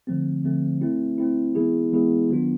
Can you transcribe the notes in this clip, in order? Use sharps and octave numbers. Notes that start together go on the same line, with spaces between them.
D3 F3 A3 C4
D3 F3 A3 C4
A3 C4 E4
A3 C4 E4
E3 G#3 B3 E4 G#4
E3 G#3 B3 E4 G#4
D#3 F#3 B3 D4 F4